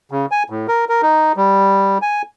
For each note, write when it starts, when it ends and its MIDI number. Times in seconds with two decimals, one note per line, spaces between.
0.11 0.26 49
0.31 0.43 80
0.50 0.67 45
0.68 0.85 70
0.89 1.01 70
1.02 1.32 63
1.37 1.98 55
2.02 2.22 80